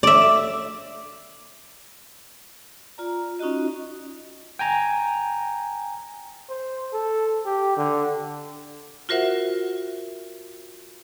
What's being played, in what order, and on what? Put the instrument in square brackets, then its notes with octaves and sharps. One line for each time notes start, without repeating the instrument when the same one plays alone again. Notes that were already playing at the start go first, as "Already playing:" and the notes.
[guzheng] D5 E5
[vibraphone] F4 D5 A#5
C#4 D#4 F4 F#4 D#5
[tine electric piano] G5 G#5 A#5
[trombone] C5
A4
G4
D3
[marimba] F4 F#4 A#4 C5 E5 F#5